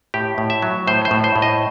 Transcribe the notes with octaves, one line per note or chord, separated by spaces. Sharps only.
A2 G4
A2
E5
F#3
A2 C5
C5
A2
C5
A2
D#5